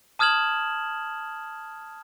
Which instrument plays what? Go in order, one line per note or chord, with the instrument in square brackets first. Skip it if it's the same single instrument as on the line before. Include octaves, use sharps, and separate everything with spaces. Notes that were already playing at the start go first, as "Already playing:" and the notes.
[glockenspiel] A5 D#6 F6 G#6 E7 F#7